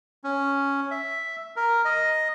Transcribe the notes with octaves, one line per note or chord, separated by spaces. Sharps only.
C#4
E5
A#4
D#5